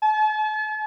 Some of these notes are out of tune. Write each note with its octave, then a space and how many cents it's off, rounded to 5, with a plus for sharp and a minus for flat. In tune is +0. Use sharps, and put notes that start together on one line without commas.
A5 -40